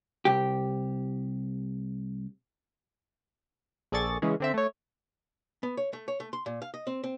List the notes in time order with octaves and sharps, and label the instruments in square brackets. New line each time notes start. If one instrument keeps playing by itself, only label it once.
[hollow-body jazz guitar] C2 G4
[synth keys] A#1 G#4 A4 D5 C#6 A6
C#3 E3 G#3 C#4 G#4
D3 C4 E5
A3 C#5
[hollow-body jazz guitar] B3
C#5
A3
C#5
A3
C6
A#2
F5
D#5
C4
C4